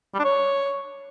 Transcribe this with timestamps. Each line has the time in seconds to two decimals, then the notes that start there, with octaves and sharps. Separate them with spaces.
0.14 G3
0.19 D4
0.24 C#5